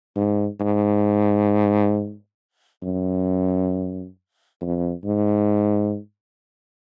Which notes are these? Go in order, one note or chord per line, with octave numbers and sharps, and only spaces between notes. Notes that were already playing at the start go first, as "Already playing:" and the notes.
G#2
G#2
F#2
F2
G#2